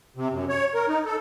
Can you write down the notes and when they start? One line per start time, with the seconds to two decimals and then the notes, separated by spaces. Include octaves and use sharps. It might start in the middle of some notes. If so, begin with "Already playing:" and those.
0.16 C3
0.31 F#2
0.49 C#5
0.74 A#4
0.88 D#4
1.06 A4